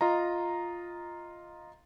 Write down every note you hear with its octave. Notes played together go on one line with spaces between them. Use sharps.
F4 D#5 A#5